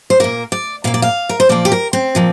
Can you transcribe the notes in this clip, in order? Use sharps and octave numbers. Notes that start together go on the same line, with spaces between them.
C5
A#2 A#3 A#4
D5
A#2 A#3 F5
D5
F5
A#4
C5
A#2 F3 A#3 D5
G4
A#4
C4
A#2 F3 A#3